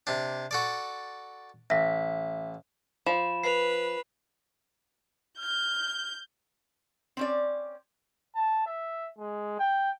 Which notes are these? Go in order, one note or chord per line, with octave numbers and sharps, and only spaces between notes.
C3 D4
F#4 A4 D5
A1 E5 B6
F3 B5 E7
B4 C7 F7
F6 G6
C4 C#4 D5
A5
E5
G#3
G5